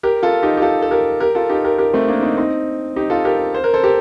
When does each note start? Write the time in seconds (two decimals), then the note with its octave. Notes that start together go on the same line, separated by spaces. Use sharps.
0.03 G4 A#4
0.23 F4 A4
0.43 D#4 G4
0.57 G4
0.62 F4 A4
0.82 A4
0.91 G4 A#4
1.20 G4 A#4
1.35 F4 A4
1.50 D#4 G4
1.64 G4 A#4
1.78 G4 A#4
1.93 A3 C4
2.08 A#3 D4
2.23 C4 D#4
2.37 C4 D#4
2.96 D#4 G4
3.10 F4 A4
3.25 G4 A#4
3.55 C5
3.64 A#4
3.74 A4 C5
3.83 G4 A#4